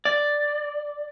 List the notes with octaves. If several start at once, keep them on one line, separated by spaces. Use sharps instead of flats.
D5